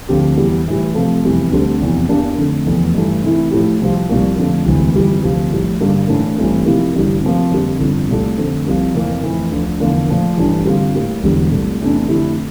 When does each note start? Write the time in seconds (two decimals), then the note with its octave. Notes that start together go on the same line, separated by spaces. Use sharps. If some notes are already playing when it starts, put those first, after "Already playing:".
0.09 D2 D3 F3 C4 G4
0.37 E2 E3 G3
0.66 A2 E3 G3
0.95 C3 F3 A3
1.23 F1 E2 C3 E3 G3
1.51 D2 D3 G3 C4
1.80 F1 E2 C3 E3
2.09 E2 E3 A#3 D4 G4
2.38 F2 D3 A3
2.66 F1 E2 E3 A3
2.95 G2 E3 A3
3.23 C3 E3 A3 E4
3.51 A2 F3 A3 E4 G4
3.80 C2 C3 F3 C4 G4
4.09 C2 A#2 F3 A#3
4.38 F2 D3 F3 A3
4.65 E1 D2 C3 E3
4.94 G1 F2 E3 G3
5.23 D2 C3 F3 C4 G4
5.52 A#1 A2 G3
5.80 G2 D3 G3 A#3
6.09 A2 E3 A#3 D4 A4
6.37 A1 G2 E3 A3 C4
6.66 C3 F3 A#3 E4 G4
6.94 A1 G2 D3 G3
7.23 C3 F3 A#3
7.51 F2 D3 G3 A#3
7.80 G1 F2 D3
8.09 C2 A#2 A3
8.38 F2 D3 A3 C4
8.66 C2 C3 F3 A#3
8.95 F2 C3 E3 A#3
9.23 F2 E3 A3 C4
9.51 D2 D3 F3
9.80 E2 D3 F3 A#3
10.09 A#2 F3 A3
10.37 A1 G2 E3 A3 D4
10.65 G2 D3 G3 C4 F4
10.94 A2 G3 A#3
11.23 E1 E2 D3 G3
11.51 C2 A#2 A3
11.80 E2 C3 E3 A3 D4
12.08 F2 D3 A3 E4 G4